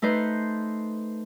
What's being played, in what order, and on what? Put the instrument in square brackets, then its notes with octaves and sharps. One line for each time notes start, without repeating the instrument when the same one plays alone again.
[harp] A3 D#4 B4 C5